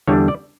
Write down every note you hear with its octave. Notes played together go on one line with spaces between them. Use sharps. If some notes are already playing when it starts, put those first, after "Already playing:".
E2 D3 G3 D4 C#5
D5